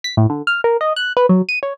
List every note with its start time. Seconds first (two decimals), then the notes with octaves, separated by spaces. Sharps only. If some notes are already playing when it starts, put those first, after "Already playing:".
0.04 B6
0.17 A2
0.30 D3
0.47 F6
0.64 A#4
0.81 D#5
0.96 F#6
1.17 B4
1.29 F#3
1.49 D#7
1.63 C#5